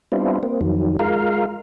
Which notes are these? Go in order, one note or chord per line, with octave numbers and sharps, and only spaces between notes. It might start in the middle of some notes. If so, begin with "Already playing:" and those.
G3 B3 C4 D4 E4 F4
A#3 C4
F2 D#3 F#3
G#3 F4 A#4 F5